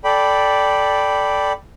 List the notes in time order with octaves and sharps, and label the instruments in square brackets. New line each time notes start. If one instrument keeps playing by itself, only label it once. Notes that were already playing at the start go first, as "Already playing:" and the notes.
[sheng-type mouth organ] A4 D5 G5 B5